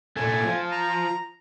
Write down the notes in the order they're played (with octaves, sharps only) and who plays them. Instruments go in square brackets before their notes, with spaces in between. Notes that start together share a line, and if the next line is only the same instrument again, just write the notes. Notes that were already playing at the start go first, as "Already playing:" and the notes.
[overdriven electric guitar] A#2 A3 [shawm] G#5
[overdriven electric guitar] F3
[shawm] A#5